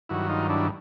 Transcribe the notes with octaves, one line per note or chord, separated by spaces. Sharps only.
G2 D#3 F#3 E4 F#4
D#4 F4
D4 E4